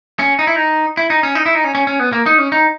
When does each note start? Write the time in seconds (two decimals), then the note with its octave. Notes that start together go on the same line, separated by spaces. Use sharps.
0.19 C#4
0.39 D#4
0.47 E4
0.56 D#4
0.97 E4
1.10 D#4
1.23 C#4
1.35 D#4
1.46 E4
1.55 D#4
1.64 C#4
1.75 C#4
1.87 C#4
2.00 B3
2.13 A#3
2.26 D#4
2.39 C#4
2.52 D#4